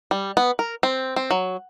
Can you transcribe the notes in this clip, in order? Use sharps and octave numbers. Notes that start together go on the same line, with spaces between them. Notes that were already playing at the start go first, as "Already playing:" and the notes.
G3
B3
A#4
C4
C4
F#3